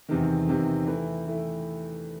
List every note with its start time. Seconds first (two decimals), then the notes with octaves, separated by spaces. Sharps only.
0.09 E2 C3 D#3
0.47 E2 C3 D#3
0.86 E3 A3 E4
1.26 E3 A3 E4